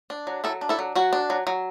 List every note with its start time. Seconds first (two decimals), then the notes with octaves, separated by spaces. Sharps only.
0.10 D4
0.27 F#3
0.44 F#3 E4 A4
0.61 D4
0.69 E4 A4
0.79 F#3
0.95 F#3 F#4
1.13 D4
1.30 F#3
1.47 F#3